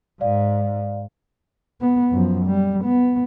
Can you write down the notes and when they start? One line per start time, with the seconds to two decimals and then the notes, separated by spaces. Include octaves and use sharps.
0.21 G#2 D5 F5
1.81 B3
2.11 F#2 F3
2.45 G3
2.84 B3